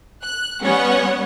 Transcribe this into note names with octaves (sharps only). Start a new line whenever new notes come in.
F#6
G3 B3 C#4 C#5 F#5